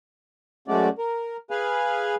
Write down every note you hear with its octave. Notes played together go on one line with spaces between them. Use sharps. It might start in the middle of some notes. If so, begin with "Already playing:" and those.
F#2 G#3 A3 C#4 F#4 D5
A#4
G#4 B4 F5 G#5